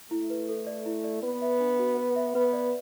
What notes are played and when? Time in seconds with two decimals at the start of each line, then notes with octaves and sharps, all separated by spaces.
0.11 A3 E4
0.30 B4
0.49 A4
0.67 D5
0.86 E4
1.04 D5
1.23 B3 B4
1.42 E5
1.60 D4
1.79 F#4
1.97 B4
2.16 E5
2.35 B3 B4
2.53 D5